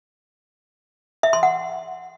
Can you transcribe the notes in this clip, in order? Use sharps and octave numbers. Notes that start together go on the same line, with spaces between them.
E5
C6
F#5